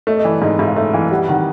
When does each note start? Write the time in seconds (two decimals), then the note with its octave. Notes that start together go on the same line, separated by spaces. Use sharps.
0.07 A3 D#5
0.17 D#5
0.24 E3 D5
0.42 G#2 D#5
0.59 G#2 E5
0.68 F5
0.76 A3 E5
0.93 E3 F5
1.11 G3 F#5
1.28 D#3 F#5